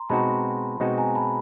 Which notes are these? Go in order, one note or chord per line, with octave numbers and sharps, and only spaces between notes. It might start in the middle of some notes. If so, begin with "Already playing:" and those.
Already playing: A#5 C6
B2 G#3 C4 D#4 F#4 A5 B5
B2 G#3 C4 D#4 F#4
G#5 A#5
A5 B5